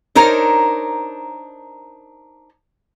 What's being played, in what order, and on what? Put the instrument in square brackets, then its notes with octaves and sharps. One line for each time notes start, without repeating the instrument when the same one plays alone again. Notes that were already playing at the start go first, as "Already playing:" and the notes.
[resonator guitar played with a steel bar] D4 D#4 A#4 C5 C#5